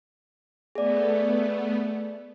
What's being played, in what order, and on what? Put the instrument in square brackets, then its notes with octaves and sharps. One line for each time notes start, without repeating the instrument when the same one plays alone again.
[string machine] A3 B3 [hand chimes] G#4 D5